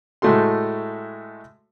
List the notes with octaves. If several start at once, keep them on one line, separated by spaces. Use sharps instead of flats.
A2 G#3 A3 F#4 A4 C6